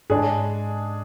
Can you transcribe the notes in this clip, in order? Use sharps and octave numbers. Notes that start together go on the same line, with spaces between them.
G#2 G#3 D4 G#4